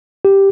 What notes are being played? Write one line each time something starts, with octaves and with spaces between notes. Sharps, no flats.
G4